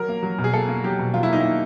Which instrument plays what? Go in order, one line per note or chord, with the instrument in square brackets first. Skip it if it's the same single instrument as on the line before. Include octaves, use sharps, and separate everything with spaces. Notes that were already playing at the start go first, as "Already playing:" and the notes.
Already playing: [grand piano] F#3 A#4
A#3
F#3
B2
G#4
A#3 A4
A#3
F#3 G4
B2
F#3 F4
E4
A#3 D#4
A#3 E4